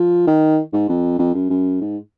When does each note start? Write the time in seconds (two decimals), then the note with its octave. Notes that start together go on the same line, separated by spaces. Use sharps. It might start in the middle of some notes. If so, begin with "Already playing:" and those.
Already playing: F3
0.27 D#3
0.73 G#2
0.89 F2
1.19 F2
1.34 F#2
1.50 F#2
1.81 G#2